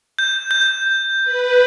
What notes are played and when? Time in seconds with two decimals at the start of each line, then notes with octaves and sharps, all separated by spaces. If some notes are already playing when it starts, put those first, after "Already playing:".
0.19 G6
0.51 G6
1.23 B4